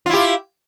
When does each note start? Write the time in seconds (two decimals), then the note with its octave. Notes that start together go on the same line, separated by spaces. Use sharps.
0.06 F4
0.10 E4
0.13 G4